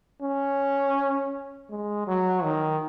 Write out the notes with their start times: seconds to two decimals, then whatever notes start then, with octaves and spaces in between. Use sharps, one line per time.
0.22 C#4
1.70 G#3
2.07 F#3
2.44 D#3